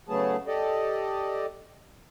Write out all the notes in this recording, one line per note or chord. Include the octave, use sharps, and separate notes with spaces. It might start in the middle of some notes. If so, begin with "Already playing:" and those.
C#3 F#3 A3 B3 G#4 A5
G4 A4 D5 D#5